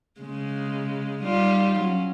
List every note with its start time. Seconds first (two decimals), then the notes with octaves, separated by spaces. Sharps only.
0.20 C#3 G#3
1.23 G3 D#4 F4
1.79 F#3 C#4